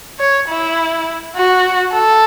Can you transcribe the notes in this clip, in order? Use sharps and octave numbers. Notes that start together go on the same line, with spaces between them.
C#5
E4
F#4
A4